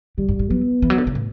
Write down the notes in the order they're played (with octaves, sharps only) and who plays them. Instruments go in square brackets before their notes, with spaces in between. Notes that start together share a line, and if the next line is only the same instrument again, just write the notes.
[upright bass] D3 [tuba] G3
[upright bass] G2
A2
[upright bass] F#3 [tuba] B3
[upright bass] E3
F#3
D3
C#3
A2